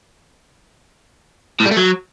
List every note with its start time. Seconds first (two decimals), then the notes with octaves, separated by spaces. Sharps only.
1.60 A2
1.66 G3
1.71 A3
1.77 F#3